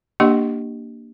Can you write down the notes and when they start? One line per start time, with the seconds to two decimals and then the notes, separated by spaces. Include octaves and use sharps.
0.20 A#3 D4 G4 D#5 F#5 C#6